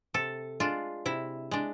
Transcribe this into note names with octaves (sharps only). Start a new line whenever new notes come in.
C3 A4
G#3 D4 F4
C3 E4
G#3 D4